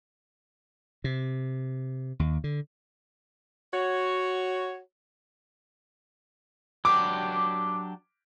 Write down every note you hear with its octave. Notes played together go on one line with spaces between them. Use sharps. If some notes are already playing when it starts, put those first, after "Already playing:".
C3
D#2
D3
F#4 C#5
F#3 D4 G4 D6